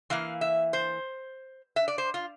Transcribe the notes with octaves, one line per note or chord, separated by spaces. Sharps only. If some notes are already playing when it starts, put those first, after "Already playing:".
E3 A#3 F5
E5
C5
E5
D5
C5
F4